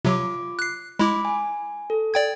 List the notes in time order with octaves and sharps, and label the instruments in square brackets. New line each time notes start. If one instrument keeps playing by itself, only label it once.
[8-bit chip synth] C3 F#3 [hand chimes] F4 D6
[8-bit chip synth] F#6 C7
[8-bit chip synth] G#3 E4 [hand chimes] B5 D6
[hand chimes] G#5
A4
[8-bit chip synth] D5 G5 G#6